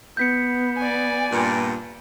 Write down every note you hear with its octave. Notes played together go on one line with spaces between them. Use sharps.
B3 G6 B6 C#7
D5 G#5
G2 A#2